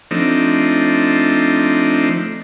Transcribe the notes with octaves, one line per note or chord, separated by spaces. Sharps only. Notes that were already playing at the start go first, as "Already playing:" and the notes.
F3 A3 C4 D4 D#4